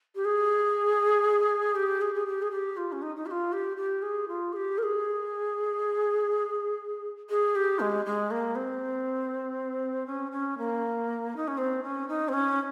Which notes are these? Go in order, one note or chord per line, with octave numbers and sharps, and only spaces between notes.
G4
G#4
G4
G#4
G#4
G4
G#4
G4
F4
C#4
D#4
D#4
G4
F4
G4
G4
G#4
F4
G#4
G4
A#4
G#4
G#4
G4
G#3
G#3
A#3
C4
C#4
C#4
A#3
D#4
C#4
C4
C#4
D#4
C4
C#4